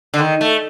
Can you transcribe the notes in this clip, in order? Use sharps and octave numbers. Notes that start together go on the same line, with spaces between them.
D3
D#3
A3